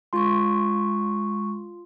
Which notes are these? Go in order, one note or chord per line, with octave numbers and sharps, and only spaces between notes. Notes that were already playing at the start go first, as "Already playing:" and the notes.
G#3 F4 C6 C#6